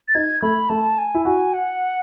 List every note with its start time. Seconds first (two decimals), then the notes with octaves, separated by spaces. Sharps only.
0.08 A6
0.15 D#4 G#6
0.42 A3 B5
0.69 A3 A5
0.98 G#5
1.15 E4
1.25 F#4 G#5
1.54 F#5